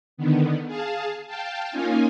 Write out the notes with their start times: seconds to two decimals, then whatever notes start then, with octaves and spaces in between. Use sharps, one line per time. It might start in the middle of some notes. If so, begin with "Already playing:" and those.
0.17 D3 D#3 B3
0.67 G#4 F5 A5
1.27 F5 G5 A5
1.70 A#3 C#4 D#4 F4 G#5